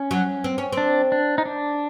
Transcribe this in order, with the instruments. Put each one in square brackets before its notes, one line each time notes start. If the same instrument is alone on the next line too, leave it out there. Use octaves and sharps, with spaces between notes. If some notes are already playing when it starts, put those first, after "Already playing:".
Already playing: [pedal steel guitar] C#4
[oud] F#3
C4
C#4
C4
[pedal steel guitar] D4
D4
D#4
D4